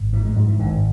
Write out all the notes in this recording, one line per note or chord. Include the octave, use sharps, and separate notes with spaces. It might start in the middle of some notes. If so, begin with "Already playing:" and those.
Already playing: G#1
G#2 E3
G#3
G#2 F#3
E3
G#1 D3